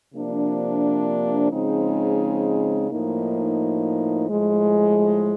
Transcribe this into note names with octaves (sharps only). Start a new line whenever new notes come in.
C3 F3 A#3 D4
C#3 F3 G#3 C4 D#4
A2 F3 A#3 D#4
A2 F3 G#3